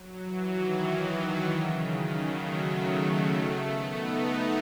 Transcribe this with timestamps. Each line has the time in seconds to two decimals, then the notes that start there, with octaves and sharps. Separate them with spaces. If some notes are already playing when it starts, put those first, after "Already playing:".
Already playing: F#3
0.23 E3
0.54 D#3
1.00 D#3
1.47 C#3
1.78 D#3
2.08 F#3
2.39 A3
2.86 A3
3.32 A3
3.63 B3
3.94 D#4